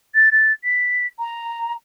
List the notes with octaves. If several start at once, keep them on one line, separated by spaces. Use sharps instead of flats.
A6
A6
B6
A#5